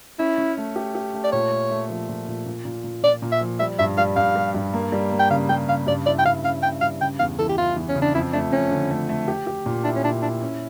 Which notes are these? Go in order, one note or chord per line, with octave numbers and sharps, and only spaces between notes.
C#4 E4
C#4
A3
G4
G4
A3
D5
A#2 C#5
A3
A3
F3
A#2
A#2
A#2
A#2
A#2
A#2 D5
A#2
E5
F3
G3 E5
G2 E5
G3 F5
G2 F5
G3
G2
A#3
G3
A#3
G5
C#3 F5
G3 G5
C#3 F5
G2 D5
E4 D5
G5
G2 F5
C#4 F5
C#4 G5
G2 F5
C#3 G5
E2 F5
E3 A4
G4
E3 F4
E2
C#4
C#3
D4
F2 E4
A3 D4
F2 C#4
D3
A3
A3
G4
G4
A#2
D4 E4
C#4
A#2 D4
D4 E4
C#4